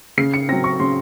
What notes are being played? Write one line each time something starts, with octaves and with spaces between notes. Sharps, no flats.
C#3 C7
C#7
F#3 C4 A#6
C#6
C#3 C6